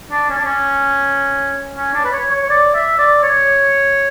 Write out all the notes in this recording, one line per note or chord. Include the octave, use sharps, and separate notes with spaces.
D4
C#4
D4
C#4
C#4
D4
B4
C#5
C#5
C#5
D5
E5
D5
C#5